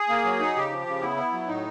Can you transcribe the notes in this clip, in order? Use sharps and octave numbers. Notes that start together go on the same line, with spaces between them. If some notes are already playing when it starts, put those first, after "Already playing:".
Already playing: G#4
A#3
F#3
D#4
C#3 G4
F3
C#3
B3 E4
B3
F#3
A2 D#4